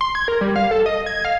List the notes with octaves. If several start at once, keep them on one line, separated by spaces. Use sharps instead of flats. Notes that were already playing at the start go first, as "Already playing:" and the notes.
C6
G#6
A#4
G3
F5
A4
D#5
G#6
F5